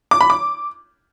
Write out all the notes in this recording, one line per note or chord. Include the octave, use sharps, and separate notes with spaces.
D6
B5
D6